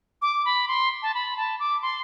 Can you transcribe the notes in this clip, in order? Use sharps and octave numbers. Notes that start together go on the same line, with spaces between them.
D6
B5
C6
A5
B5
A5
D6
C6